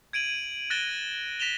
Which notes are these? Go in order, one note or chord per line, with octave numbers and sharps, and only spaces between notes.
G#6 D7 D#7 F#7
F#6 A6 A#6 D7 E7 G7
A#6 B6 E7 F7 G7